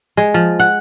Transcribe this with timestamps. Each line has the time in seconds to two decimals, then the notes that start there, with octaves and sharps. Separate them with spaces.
0.17 G#3
0.34 F3
0.60 F#5